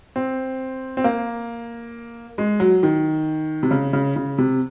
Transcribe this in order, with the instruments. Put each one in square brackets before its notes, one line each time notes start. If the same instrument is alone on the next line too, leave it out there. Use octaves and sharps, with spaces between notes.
[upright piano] C4
C4
A#3
G#3
F#3
D#3
C3
C#3
C#3
C#3
C3